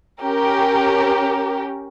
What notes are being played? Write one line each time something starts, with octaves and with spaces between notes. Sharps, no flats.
C#4 G4 A#4